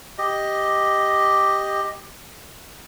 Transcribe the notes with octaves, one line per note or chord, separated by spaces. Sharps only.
G4 D#5